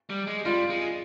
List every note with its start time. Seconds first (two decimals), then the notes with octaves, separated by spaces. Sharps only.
0.09 G3
0.27 G#3
0.45 G3 F4
0.70 G#3